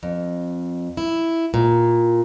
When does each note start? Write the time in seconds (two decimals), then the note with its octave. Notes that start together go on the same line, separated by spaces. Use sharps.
0.03 F2
0.97 E4
1.54 A#2